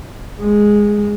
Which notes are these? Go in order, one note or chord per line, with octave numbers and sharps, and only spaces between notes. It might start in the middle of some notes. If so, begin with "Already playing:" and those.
G#3